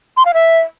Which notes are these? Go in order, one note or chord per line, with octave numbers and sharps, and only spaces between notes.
C6
F5
E5